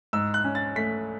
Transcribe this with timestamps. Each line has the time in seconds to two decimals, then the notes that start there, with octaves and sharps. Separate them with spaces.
0.13 G#2 E6
0.34 F#6
0.44 C#4
0.55 A6
0.76 A3 B6